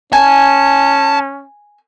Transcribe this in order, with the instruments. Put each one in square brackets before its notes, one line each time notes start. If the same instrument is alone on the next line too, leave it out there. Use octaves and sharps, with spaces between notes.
[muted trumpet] C#4 [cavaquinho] G#5 [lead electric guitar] A5